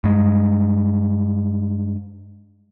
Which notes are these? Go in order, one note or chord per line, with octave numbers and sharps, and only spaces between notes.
G2 G#3